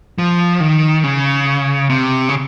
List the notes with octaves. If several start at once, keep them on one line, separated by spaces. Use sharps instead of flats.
F3
D#3
C#3
C3
C#3